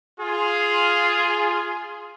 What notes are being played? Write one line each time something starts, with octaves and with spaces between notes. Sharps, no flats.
F4 G#4